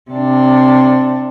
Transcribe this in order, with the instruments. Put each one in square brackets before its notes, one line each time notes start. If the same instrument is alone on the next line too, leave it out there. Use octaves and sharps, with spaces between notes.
[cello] C3 D4